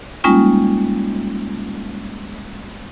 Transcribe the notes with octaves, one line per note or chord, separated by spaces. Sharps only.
G3 G#3 A#3 C#4 D#4 F4